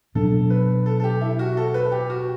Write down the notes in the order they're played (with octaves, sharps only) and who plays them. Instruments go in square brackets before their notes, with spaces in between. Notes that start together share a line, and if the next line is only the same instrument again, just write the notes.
[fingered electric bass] B2 F#3 B3 D4 [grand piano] A4
[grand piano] B4
A4
A4
G4
E4
F#4
A4
B4
G4
F#4